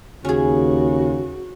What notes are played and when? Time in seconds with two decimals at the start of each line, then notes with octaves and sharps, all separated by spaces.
0.25 D#2 C#3 C#4 F#4 G#4